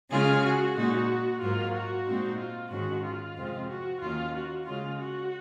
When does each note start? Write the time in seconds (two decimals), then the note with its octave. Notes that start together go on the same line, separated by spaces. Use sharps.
0.11 C#3 G#3 C#4 F4 G#4
0.43 F#4
0.77 A#2 G#3 D#4 F#4
1.41 G#2 F#3 A#3 F4
1.74 F#4
2.06 A#2 G#3 C4 D#4
2.39 F4
2.71 G#2 D#3 G#3 C#4 F#4
3.04 F4
3.36 F2 C3 F3 G#3 C4
3.69 F#4
4.01 D#2 D#3 A#3 C#4 F4
4.34 F#4
4.66 C#3 G#3 C#4 F4
4.99 F#4